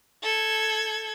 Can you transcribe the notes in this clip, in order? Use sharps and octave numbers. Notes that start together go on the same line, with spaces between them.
A4 G#6